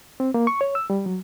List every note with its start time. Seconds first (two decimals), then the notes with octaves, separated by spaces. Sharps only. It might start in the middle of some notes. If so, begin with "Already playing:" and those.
0.20 C4
0.34 A#3
0.47 C#6
0.61 C#5
0.75 E6
0.90 G3
1.06 F#3